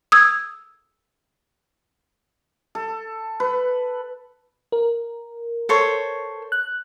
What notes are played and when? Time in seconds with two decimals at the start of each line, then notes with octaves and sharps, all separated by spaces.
0.12 D#6 E6 G#6
2.75 A4
3.40 B4
4.72 A#4
5.69 A4 C5 C#5
6.52 F#6